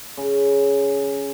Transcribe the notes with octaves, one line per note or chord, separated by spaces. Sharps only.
C#3